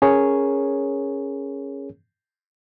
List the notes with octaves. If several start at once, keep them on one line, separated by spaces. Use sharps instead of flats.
C#4 G#4 A#4 C#5